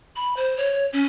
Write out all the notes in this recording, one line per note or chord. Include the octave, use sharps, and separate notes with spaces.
B5
C5
C#5
C#4